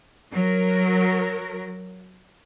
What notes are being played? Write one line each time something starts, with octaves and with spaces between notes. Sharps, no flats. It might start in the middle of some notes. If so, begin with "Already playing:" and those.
F#3 A#4